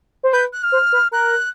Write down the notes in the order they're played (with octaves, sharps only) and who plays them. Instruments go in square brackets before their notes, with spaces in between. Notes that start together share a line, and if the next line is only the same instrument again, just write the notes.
[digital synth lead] C5
[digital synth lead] B4 [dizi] G6
[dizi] F#6
F6
[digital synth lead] C5
B4
[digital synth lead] A#4 [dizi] F#6